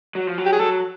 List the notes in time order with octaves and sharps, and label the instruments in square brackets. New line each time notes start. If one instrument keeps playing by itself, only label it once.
[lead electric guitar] F#3
F3
F#3
[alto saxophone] G4
G#4
[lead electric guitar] F#3 [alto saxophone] A4